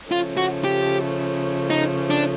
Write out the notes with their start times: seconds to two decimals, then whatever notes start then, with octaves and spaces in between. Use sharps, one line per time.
0.11 C#3 F3 A3 C#4 F4
0.37 F#4
0.64 G4
1.70 D#4
2.10 D4